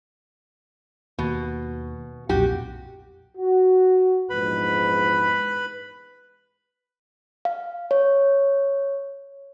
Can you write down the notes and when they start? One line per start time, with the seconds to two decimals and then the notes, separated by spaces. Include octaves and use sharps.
1.19 D#2 B2
2.29 B1 F2 A#2 F#4 G4
3.37 F#4
4.30 A#1 E2 G#2 B4 B5
7.45 F5
7.91 C#5